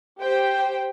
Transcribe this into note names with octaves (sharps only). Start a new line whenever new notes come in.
G4 C5 G5